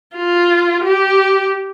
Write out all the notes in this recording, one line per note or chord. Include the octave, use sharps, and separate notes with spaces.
F4
G4